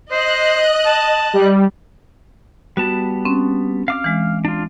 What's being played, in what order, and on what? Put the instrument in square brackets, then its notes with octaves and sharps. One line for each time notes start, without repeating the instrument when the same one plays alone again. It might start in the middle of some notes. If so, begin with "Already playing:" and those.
[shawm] C5 [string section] D#5 F#6
[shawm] A5
[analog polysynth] G3
[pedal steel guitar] G3 B3 A5 [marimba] F#4
[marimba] C4 C#4
[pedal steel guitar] F5 D6 F6
[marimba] E3 G#3
[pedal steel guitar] D4 F4